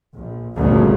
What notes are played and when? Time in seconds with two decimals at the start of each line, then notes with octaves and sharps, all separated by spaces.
0.14 A#1
0.56 G1 D2 A#2 C#3